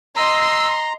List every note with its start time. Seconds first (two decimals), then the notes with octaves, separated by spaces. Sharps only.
0.16 D#5 A#5 C6 E6